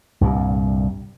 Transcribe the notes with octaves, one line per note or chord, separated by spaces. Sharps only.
C2 G2 A#2